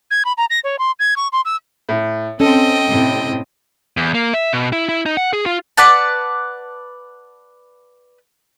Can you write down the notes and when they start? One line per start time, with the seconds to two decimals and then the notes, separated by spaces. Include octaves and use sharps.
0.11 G#6
0.25 B5
0.38 A#5
0.50 A#6
0.64 C#5
0.79 C6
1.00 G#6
1.17 C#6
1.32 C6
1.45 E6
1.89 A2
2.40 C4 C#4 A4 D#5 G5
2.89 A2 C3 C4
3.97 E2
4.14 A#3
4.34 E5
4.53 B2
4.72 E4
4.89 E4
5.06 D#4
5.17 F#5
5.33 G#4
5.46 F4
5.77 B4 D5 F#5 A5